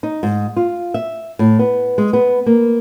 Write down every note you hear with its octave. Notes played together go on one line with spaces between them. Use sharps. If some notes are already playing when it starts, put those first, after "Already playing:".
D#4
G#2
F4
E5
A2
B3
G#3
B3
A#3